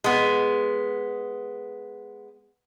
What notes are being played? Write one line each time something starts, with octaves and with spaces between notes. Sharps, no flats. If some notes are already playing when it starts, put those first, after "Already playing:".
G#3 B3